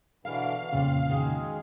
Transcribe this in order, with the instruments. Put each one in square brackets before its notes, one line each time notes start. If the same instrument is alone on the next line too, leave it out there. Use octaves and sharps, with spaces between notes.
[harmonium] B2 D3 E3 [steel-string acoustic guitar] A#4 [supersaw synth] F5
[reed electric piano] F2 C#3 [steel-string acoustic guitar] A#2 A#3 [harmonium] C4
[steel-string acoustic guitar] D#3 F#4 [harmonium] G#3 G#4